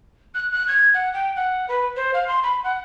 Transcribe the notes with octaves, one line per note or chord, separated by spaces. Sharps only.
F#6
F#6
G#6
F#5
G5
F#5
B4
C5
F5
C6
B5
F#5